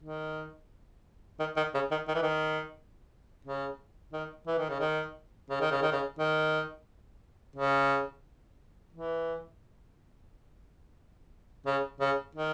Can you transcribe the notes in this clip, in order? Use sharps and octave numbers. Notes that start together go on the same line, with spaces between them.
D#3
D#3
D#3
C#3
D#3
D#3
E3
D#3
C#3
D#3
E3
D#3
C#3
D#3
C#3
D#3
C#3
D#3
C#3
D#3
C#3
E3
C#3
C#3
D#3